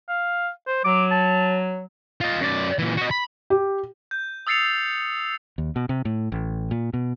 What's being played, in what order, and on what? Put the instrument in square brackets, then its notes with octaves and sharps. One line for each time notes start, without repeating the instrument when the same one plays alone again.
[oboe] F5
C5
[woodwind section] F#3 [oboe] D6
[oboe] A5
[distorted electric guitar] F4 D#5
F#2 D5
A#2 E3
F#4 D#5
B5
[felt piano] G4
[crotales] G6
D#6 E6 A6 C7 C#7 F7
[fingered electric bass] D#2
B2
C3
A2
A1
A#2
B2